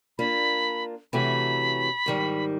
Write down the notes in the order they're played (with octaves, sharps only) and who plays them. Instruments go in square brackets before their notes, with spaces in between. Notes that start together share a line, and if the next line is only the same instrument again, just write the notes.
[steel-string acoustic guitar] A#3 D4 F4 [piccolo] B5
[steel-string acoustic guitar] C3 E3 A3 C#4 F#4 [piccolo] B5
[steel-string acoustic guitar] G#2 D#3 G3